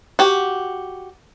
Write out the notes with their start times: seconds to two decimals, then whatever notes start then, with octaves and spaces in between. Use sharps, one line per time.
0.19 F#4 G4